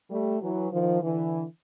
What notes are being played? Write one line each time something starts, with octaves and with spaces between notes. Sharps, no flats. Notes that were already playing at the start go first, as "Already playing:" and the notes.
G3 A3
E3 F#3
D#3 F3
D3 E3